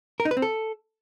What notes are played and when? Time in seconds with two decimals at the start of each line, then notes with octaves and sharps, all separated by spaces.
0.20 A#4
0.25 D#4
0.31 B4
0.37 C4
0.42 A4